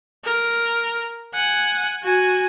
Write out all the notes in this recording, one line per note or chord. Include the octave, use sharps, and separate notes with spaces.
A#4
F#5 G#5
F#4 G#5